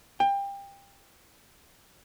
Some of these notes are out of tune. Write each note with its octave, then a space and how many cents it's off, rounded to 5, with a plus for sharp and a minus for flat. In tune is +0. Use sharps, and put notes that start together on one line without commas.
G5 +25